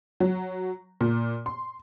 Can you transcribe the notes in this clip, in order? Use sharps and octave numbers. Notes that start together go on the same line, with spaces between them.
F#3
A#2
C6